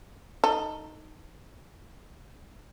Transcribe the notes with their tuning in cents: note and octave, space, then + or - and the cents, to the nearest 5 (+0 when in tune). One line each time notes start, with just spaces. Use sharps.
D#4 +0 A4 +15